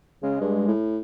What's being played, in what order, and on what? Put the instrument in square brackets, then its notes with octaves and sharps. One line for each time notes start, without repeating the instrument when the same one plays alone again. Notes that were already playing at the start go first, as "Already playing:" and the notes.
[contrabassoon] C#3 [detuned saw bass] G#3
[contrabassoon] G2
A2